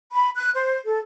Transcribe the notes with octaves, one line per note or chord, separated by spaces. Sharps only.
B5
F#6
C5
A4